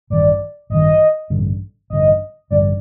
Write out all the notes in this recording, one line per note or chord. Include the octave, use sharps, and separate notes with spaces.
A1 G2 D#3 D5
A1 G2 D#3 D#5
A1 G2 D3
A1 G2 D3 D#5
A1 G2 D3 D5